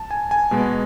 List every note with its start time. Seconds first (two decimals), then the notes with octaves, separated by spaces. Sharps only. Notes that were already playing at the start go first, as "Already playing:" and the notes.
Already playing: A5
0.11 G#5
0.31 G#5
0.51 B2 G#3 B3